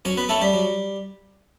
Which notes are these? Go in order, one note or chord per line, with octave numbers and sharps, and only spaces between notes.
F#3 C#4 C#5
B3 B4
A3 C#4 E4 A4
G3 G4
F#3